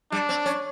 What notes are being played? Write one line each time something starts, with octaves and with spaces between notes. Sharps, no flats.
G3 D4
C4
C#4